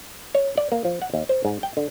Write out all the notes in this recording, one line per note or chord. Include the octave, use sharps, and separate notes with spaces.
C#5
D5
A#3
F3
F#5
D#2
C5
G#2
G5
D3